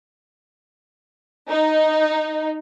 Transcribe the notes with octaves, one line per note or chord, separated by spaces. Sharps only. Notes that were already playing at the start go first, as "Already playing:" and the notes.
D#4